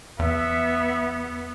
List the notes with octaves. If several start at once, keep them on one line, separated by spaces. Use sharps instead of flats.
E2 B3 E5